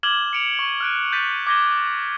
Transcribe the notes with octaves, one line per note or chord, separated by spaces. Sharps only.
D6 F6 G#6 E7 F#7 G7
C#7 D7 F7
C#6
F6 F#6 D7
F#6 G6 A6 B6 D#7
D6 G6 G#6 A#6 B6 G7